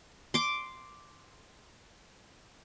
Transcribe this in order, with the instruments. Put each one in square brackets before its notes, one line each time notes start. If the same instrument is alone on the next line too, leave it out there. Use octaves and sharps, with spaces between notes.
[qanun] C6 D6